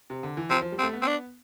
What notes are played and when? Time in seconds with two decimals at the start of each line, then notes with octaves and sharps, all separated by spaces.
0.10 C3
0.23 D3
0.37 E3
0.50 F3 C4
0.62 F3
0.72 G3
0.79 C4
0.83 A3
0.93 B3
1.02 C4
1.07 D4